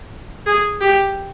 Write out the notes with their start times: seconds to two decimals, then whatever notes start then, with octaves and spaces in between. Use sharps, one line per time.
0.46 G#4
0.80 G4